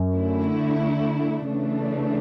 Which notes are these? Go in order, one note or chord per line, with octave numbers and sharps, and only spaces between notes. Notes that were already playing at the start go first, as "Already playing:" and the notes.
Already playing: F#2
D3 A3 E4
C#3 E3 A3 D4